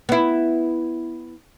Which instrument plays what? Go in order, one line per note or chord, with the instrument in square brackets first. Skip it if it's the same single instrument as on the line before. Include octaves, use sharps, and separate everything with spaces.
[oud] B3 E4